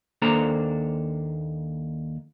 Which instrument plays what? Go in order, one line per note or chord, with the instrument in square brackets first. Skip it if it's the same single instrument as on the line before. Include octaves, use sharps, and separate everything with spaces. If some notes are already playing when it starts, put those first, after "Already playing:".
[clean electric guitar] D#2 A#3 D4 A4 C5 A#5